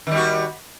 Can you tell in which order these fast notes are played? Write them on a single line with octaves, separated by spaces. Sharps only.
D#3 G3 F#4